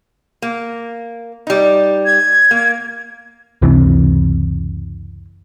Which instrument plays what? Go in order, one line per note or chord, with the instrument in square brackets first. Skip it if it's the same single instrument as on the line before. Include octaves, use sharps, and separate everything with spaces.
[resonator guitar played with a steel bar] A#3
G3 D#4
[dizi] G#6
[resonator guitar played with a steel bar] A#3
[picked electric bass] F#1 C#2 C3 E3